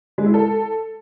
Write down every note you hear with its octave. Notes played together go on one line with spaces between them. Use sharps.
G#3
E4
A4